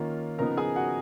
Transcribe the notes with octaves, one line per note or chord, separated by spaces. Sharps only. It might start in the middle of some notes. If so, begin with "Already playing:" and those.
Already playing: D#3 A#3 C#4 F4
C#3 F3 B3 D#4 A#4 A#5
G#4 G#5
F#4 F#5